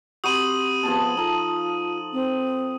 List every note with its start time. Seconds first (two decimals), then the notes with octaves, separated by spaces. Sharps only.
0.24 C4 F#4 G4 B5 C6 D#6 D#7 F#7
0.83 F3 B3 G#4 A5
1.17 D#4 F4 A4 A#5
2.12 C4